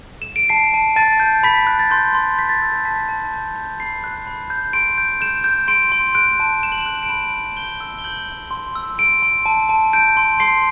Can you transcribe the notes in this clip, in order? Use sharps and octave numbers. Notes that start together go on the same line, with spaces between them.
E7
D7
A5 C7
A5
A5 A6
G6
B5 B6
F#6
A6
C6 G6
C6
G6 B6
A6
E6 G6
A6
A5 B6
A5
G6
G6
B5 C7
F#6
B5
G6
C6 D7
G6
G6 E7
G6
C6 D7
C6
F#6 D7
A5
F#6 E7
F#7
E7
F#6
D7
B5 E7
F#6
G6 G7
E6
G7
G6 F#7
G6
C6
E6
C6 D7
C6
A5
A5
G6 D7
C6
C6 C7